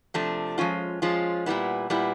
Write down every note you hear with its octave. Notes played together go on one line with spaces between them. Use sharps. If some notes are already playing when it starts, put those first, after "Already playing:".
C3 F3 A3 D4
F3 G#3 C#4 F4
F3 G#3 C#4 F4
A#2 G3 B3 E4
A#2 G3 B3 E4